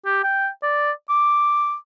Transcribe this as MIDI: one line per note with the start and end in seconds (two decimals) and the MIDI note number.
0.06 0.21 67
0.24 0.48 79
0.63 0.92 74
1.09 1.74 86